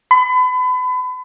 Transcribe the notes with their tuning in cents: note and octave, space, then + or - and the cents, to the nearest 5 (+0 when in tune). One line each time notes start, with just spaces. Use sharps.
B5 +35